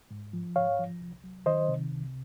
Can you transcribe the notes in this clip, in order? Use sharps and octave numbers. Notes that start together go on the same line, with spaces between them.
G#2
F3
G#2 C#5 F5
F3
C2
F#3
D#3 C5 D#5
C3
C2